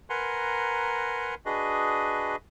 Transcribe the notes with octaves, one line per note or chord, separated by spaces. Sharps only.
A#4 B4 F#5 G#5 A#5 C6
D4 F#4 G#4 B4 D#5